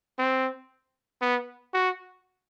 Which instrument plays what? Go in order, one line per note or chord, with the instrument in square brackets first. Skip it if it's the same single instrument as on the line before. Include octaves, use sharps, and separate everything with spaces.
[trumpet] C4
B3
F#4